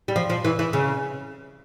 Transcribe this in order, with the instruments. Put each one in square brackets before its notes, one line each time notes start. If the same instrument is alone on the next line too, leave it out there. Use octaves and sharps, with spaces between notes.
[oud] G3
F3
F3
E3
E3
C#3